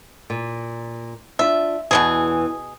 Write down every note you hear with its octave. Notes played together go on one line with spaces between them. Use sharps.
A#2
D4 F4 E5
E2 B2 E3 F#3 G#4